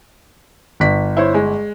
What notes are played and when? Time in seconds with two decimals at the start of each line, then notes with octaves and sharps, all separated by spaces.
0.80 G1 B6
1.17 E4 C5 C#5
1.34 G#3